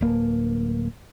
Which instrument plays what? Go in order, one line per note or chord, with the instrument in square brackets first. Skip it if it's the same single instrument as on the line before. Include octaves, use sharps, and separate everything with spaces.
[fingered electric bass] D1 A#3